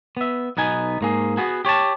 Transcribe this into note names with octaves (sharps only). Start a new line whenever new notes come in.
B3 E5
B1 B3 D#4 G#5
G#2 A#3 G#4
B3 F#4 G#4
G4 C#5 G#5 A5